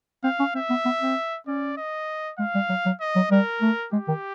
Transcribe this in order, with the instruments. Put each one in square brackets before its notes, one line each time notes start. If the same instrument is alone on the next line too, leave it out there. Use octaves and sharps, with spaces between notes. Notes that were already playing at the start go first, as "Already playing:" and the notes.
[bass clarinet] C4 [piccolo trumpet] F5
[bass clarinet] C#4
[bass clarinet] C4 [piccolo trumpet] E5
[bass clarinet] B3
B3
C4
[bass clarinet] C#4 [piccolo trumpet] D5
[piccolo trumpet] D#5
[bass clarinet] G#3 [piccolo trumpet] F5
[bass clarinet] G3
F#3
F#3
[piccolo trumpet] D#5
[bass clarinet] F#3
[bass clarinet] G3 [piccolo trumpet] A#4
[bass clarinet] A3
[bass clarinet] G#3 [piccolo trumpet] G4
[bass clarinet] D#3